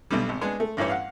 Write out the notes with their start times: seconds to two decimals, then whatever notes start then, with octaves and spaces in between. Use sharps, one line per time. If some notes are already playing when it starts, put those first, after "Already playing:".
0.10 B1 B2 D3 G3
0.29 G#1
0.41 G#3 B3 D4
0.60 A3
0.77 A1 G2 E3 G3 C#5
0.90 F5 F#5